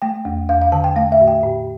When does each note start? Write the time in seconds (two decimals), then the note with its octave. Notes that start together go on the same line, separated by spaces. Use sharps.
0.02 A3 G5
0.25 E2
0.49 E2 F5
0.62 F5
0.72 D3 A5
0.84 G5
0.96 A3 F5
1.12 E5
1.20 A2
1.27 G5
1.43 A2